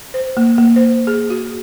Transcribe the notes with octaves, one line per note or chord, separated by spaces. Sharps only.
C5
A#3
A#3
C5
G#4
F#4